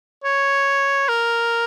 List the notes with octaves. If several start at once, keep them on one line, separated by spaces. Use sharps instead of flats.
C#5
A#4